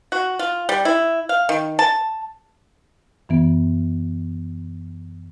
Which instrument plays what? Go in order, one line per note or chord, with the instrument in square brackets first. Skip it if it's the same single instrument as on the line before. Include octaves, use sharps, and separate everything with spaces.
[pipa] F#4
F4
G3
E4
F5
D#3
A5
[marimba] F#2 E3 B3